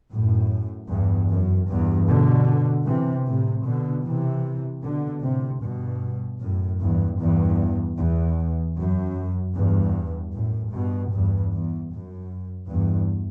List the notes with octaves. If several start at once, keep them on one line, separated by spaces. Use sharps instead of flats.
F#2 A2
E2 G2
F#2
E2 G2
B2 D3
C3 E3
A2 C3
B2 D3
C3 E3
B2 D3
A2 C3
G2 B2
F#2 A2
E2 G2
E2 G2
E2
F#2
E2 G2
F#2 A2
G2 B2
E2 G2
E2
F#2
E2 G2